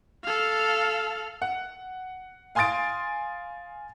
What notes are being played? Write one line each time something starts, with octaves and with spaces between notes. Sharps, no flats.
A4 F5
F#5
F5 G#5 C6 D#6 A6 D7